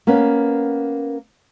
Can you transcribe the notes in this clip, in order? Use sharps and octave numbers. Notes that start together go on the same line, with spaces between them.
A#3 B3 C#4